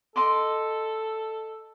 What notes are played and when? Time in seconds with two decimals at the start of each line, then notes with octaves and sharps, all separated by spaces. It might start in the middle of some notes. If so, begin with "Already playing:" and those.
0.16 A4 D#5 C6 D6